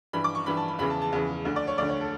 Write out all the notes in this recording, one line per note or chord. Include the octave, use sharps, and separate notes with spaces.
G2 E3 B5
D6
C#6
G2 E3 B5
A5
B5
E2 C#3 E3 B5
A5
A5
E2 C#3 E3
D2 D3
D5
C#5
D2 D3 D5
C#5
A4